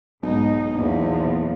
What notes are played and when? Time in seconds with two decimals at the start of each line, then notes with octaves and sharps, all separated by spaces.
0.23 B1 G#2 D#4
0.77 E2 A#2 F3